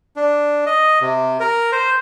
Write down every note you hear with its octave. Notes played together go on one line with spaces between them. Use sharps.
D4
D#5
C3
A#4
C5